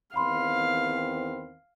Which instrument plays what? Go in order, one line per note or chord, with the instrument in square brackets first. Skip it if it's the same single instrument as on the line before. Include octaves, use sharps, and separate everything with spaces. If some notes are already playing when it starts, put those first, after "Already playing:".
[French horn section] E2 D#3 C4 [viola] F5 [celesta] B5 C6